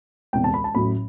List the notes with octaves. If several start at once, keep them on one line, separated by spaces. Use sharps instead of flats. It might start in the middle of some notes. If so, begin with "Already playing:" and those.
E1 E2 C3 G5
A5
B5
A5
A1 A2 F#3 A3 B5